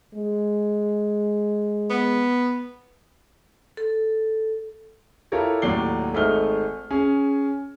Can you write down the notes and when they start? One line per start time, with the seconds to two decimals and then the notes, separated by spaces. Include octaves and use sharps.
0.14 G#3
1.90 B3
3.77 A4
5.32 E4 F4 G4 A4 A#4 C#5
5.62 D#2 A2 F#3 D5 C7 G7
6.14 G#1 A3 D#4 G#4 F6 G7
6.91 C#4 G#4